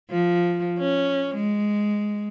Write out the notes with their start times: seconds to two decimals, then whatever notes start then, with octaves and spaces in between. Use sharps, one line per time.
0.10 F3
0.78 C#4
1.35 G#3